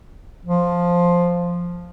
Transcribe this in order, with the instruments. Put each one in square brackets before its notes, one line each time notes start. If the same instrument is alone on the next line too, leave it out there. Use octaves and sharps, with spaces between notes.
[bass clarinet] F3